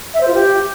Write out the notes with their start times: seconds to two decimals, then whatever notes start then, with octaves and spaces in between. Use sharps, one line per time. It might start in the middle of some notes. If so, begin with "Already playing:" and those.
0.14 E5
0.21 C5
0.28 F4
0.34 G4